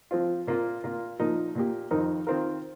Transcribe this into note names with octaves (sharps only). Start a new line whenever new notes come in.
F3 C4 F4
A#2 A#3 F4
A#2 A#3 F4
A#2 F3 D#4 A#4
A#2 A#3 G4
F2 D#3 C4 D#4 A#4
D#3 C4 F4 A#4